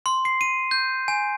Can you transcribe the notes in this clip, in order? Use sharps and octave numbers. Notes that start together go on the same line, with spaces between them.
C6
C7
D#7
G6
G#5